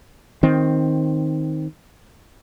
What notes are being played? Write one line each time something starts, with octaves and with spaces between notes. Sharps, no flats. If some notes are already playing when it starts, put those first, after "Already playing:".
D#3 C4